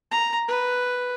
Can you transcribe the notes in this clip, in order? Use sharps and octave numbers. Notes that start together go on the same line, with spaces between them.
A#5
B4